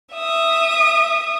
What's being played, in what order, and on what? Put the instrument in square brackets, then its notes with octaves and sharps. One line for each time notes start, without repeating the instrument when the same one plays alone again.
[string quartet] E5 D#6